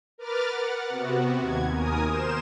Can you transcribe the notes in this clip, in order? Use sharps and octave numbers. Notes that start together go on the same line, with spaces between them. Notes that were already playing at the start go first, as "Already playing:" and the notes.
A#4 B4 D6 F6 A6
F#5
C3 B3 F#4
D#2 G#6
D#2 A#4 G#5 D#6
A#4 C5 E7